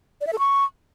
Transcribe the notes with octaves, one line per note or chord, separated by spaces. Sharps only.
D5
E5
A4
C#6